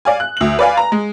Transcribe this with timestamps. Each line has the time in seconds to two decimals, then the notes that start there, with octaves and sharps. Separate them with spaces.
0.05 D5 F5 G#5
0.20 F#6
0.37 D2 F#7
0.59 B4 D5 F5 G#5
0.77 A#5
0.92 G#3